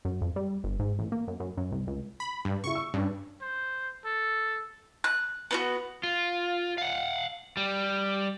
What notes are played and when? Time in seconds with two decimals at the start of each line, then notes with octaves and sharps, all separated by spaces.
0.05 F#2
0.21 F2
0.36 G3
0.64 G1
0.79 G#2
0.99 A1
1.12 A#3
1.28 F#2
1.40 F#2
1.57 F#2
1.72 C2
1.87 C#2
2.20 B5
2.45 G2
2.64 C#3 E4 C#6
2.75 E6
2.94 G2 C#4 D4
3.42 C5
4.05 A4
5.04 F#6
5.51 B3 D4 F#4
6.03 F4
6.78 F5 F#5
7.57 G3